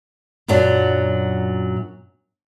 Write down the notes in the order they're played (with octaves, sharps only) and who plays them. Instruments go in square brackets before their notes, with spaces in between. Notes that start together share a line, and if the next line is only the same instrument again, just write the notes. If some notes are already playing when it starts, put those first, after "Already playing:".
[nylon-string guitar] F#2 A#2 F#3 D4